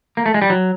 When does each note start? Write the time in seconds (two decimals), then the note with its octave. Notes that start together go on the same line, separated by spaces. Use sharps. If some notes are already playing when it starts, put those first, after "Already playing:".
0.17 A#3
0.26 A3
0.34 G#3
0.42 G3
0.50 F#3